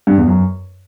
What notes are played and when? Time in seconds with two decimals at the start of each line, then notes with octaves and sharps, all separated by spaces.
0.07 G2
0.17 E2
0.28 F#2